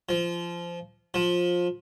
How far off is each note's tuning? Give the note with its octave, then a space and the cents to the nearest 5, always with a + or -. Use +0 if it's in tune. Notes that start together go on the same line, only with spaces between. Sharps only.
F3 -20
F3 +15